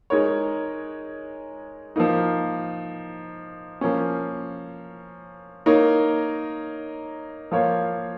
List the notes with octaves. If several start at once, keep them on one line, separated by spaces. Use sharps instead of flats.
G#3 D#4 A#4 C#5
F3 A#3 D#4
F3 A#3 C#4
A#3 D#4 A#4 C#5
F3 A#3 F4 C#5